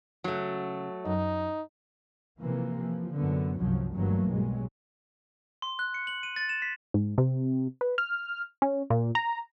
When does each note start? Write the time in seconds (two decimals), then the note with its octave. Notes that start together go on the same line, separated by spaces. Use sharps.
0.24 C#3 F#3 A3 C#4
1.05 F#2 D#4
2.41 C3 E3 F3 A#3
2.78 E3 F3
3.14 F#2 D3 B3
3.58 G1 C2 F#2 F3 F#3
3.94 G1 G2 E3 F#3 A3 A#3
4.26 B1 G2 F#3 G#3
5.62 C6
5.79 F#6
5.94 C#7
6.07 F#7
6.23 D#7
6.36 A6
6.49 E7
6.62 B6
6.94 G#2
7.18 C3
7.81 B4
7.98 F6
8.62 C#4
8.90 A#2
9.15 A#5